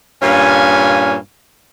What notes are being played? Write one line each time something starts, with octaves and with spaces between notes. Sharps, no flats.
G2 A#2 C#4 F5 G#5